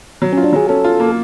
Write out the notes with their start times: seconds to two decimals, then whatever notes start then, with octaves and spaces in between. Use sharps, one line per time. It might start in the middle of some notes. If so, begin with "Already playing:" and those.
0.22 F#3
0.33 C#4 F4
0.44 D4
0.53 F#3 G#4
0.69 C#4 A4
0.84 F4
1.00 A#3